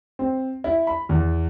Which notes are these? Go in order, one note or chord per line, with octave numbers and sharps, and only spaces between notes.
C4
E4
B5
E2